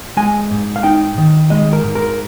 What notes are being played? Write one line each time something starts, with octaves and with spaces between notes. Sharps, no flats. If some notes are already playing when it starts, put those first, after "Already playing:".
G#3 G#5
G#2
F5
D#4 G5
D#3
G#3 D#5
A#4
G#2
A#4